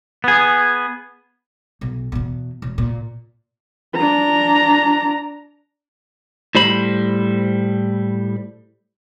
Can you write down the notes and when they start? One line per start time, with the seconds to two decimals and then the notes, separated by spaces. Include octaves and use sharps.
0.24 B3 G#4
1.81 B1
2.12 E2 B2
2.62 E1
2.78 A#2
3.96 D4 A#5
6.55 A2 G3 C5 B5